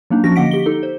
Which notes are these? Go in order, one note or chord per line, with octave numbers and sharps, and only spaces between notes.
F#3 A#3 D4 D#4
F3 C#4 F#4 A#6
D3 A#3 D#5 F#5 B6 D7
G4 G7
D#4 A4
C5